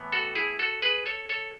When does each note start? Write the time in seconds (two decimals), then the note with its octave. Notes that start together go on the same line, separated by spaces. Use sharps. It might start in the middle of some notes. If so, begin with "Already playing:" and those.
Already playing: A2 E3 B3
0.12 F#4 A4
0.35 E4 G#4
0.59 F#4 A4
0.82 G#4 B4
1.06 A4 C#5
1.29 A4 C#5